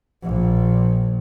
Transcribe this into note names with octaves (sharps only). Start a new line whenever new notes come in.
A#1 A#2